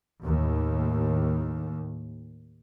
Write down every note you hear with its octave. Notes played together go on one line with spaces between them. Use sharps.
D#2 A2